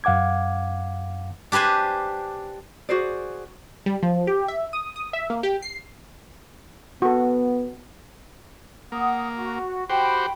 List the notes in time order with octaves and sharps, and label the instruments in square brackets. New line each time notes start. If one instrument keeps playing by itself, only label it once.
[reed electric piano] F#2 F5 F#5 D6 G#6
[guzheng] D4 G4 B4 C5 G#5
[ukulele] F#4 G#4 C5 D5
[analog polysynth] G3
F3
G4
E5
D#6
D#6
E5
A#3
G4
C7
[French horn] B3 [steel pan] F#4 A4
[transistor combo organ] A#3 [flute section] F#5 D#6
[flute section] F#4
[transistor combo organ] F#4 G4 C5 [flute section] G5 B5